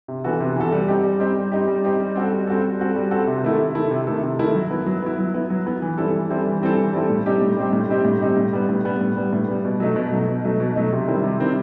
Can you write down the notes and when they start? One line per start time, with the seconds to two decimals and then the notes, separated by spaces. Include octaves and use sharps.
0.08 C3
0.24 E3 B3 F#4 A4
0.40 C3
0.56 E3 B3 F#4 A4
0.72 G3
0.88 C4 D#4 G4
1.04 G3
1.20 C4 D#4 G4
1.36 G3
1.52 C4 D#4 G4
1.68 G3
1.84 C4 D#4 G4
2.00 G3
2.16 C4 F#4 A4
2.32 G3
2.47 C4 F#4 A4
2.64 G3
2.79 C4 F#4 A4
2.96 G3
3.11 C4 F#4 A4
3.27 C3
3.44 D#3 A3 E4 A4
3.59 C3
3.75 D#3 A3 E4 A4
3.91 C3
4.07 D#3 A3 E4 A4
4.23 C3
4.39 D#3 A3 E4 A4
4.55 F#3
4.71 B3 E4
4.86 F#3
5.02 B3 E4
5.18 F#3
5.34 B3 E4
5.50 F#3
5.66 B3 E4
5.82 E3
5.98 G3 C4 E4 A4
6.14 E3
6.30 G3 C4 E4 A4
6.46 E3
6.62 G3 C4 E4 A4
6.77 E3
6.93 G3 C4 E4 A4
7.10 A2
7.26 G3 C4 D#4 G4
7.41 A2
7.57 G3 C4 D#4 G4
7.73 A2
7.89 G3 C4 D#4 G4
8.05 A2
8.21 G3 C4 D#4 G4
8.37 A2
8.53 G3 B3
8.69 A2
8.85 G3 B3
9.01 A2
9.17 G3 B3
9.33 A2
9.48 G3 B3
9.65 B2
9.80 F#3 A3 D#4
9.96 B2
10.12 F#3 A3 D#4
10.28 B2
10.45 F#3 A3 D#4
10.60 B2
10.76 F#3 A3 D#4
10.93 C3
11.08 D#3 G3 C4 E4
11.24 C3
11.40 D#3 G3 C4 E4